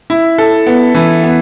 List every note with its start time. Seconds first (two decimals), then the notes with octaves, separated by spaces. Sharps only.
0.10 E4
0.38 A4
0.67 B3
0.95 E3
1.23 B3